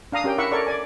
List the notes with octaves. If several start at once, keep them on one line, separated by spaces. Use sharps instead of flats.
D4 F5 A#5 D#6
C#4 G4 A#4 G5
E4 A#4 E5 F#5 B5 C#6
A4 A#4 C#5 D5 C#6
D5 G#5